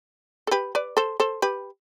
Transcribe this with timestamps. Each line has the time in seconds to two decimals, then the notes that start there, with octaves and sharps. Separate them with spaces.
0.47 A4
0.51 G4 B4
0.75 B4 D5
0.97 A4 C5
1.20 A4 C5
1.42 G4 B4